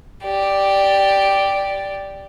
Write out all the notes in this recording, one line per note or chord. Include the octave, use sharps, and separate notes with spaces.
G4 D5